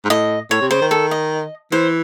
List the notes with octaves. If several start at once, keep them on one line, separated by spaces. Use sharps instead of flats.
G#2
A2 D#5
A2 C#5
C3
C#3 C5
D#3
A4
D#5
E3 C5